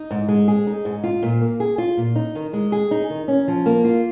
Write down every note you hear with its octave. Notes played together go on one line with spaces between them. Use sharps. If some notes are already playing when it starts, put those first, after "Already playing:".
Already playing: D#4
G#2
G#3
G#4
D#4
G#2
F4
A#2
A#3
G#4
F4
A#2
D#4
D#3
G#3
G#4
D#4
D#3
C#4
F3
A#3
F4